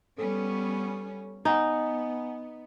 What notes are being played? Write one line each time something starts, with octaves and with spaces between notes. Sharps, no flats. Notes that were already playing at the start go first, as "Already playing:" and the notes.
G3 B3 C#4 A4
B3 D#4 F#5 G#5 A#5